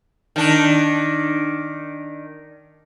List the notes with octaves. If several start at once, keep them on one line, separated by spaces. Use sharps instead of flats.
D#3 D4